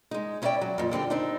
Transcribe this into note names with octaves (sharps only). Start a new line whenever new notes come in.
G#3 D#4
B3 C#4 E4 B4 D5 G5
F#3
F2 A#2
D3 G3 C4 G4
C4 D4 D#4